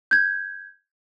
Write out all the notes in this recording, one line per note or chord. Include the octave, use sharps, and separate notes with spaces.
G6 G#6